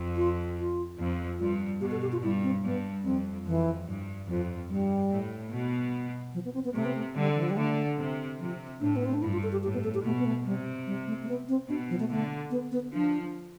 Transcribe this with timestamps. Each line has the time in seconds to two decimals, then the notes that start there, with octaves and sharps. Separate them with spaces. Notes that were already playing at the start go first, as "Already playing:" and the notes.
Already playing: F2
0.16 F4
0.58 F4
0.99 F2
1.40 G2 F4
1.81 B2 G4
1.91 A4
2.02 G4
2.12 F4
2.22 G2 E4
2.43 C4
2.63 G2 B3
3.04 F2 C4
3.46 F2 E3
3.87 G2
4.28 F2 F3
4.69 G2 G3
5.11 A2
5.52 B2
6.34 F3
6.45 B3
6.54 C4
6.65 B3
6.75 C3 A3
6.85 B3
6.95 A3
7.16 D3 G3
7.35 E3
7.43 F3
7.50 G3
7.57 D3 A3
7.98 C3
8.39 C3 F3
8.81 A2 D4
8.96 B3
9.05 C4
9.14 D4
9.22 G2 E4
9.32 F4
9.43 A4
9.52 G4
9.63 A2 G4
9.74 B3
9.84 A4
9.94 G4
10.04 B2 A3
10.20 B3
10.25 A3
10.45 C3 G3
10.86 G3
11.07 A3
11.22 A3
11.28 B3
11.49 C4
11.69 B2 D4
11.90 F3
12.00 A3
12.10 D3 A3
12.51 B3
12.72 B3
12.92 F3 D4